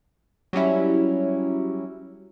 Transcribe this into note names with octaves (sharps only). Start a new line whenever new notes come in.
F#3 G3 C#4 E4